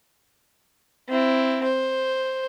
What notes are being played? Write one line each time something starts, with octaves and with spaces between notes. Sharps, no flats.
C4 E4
C5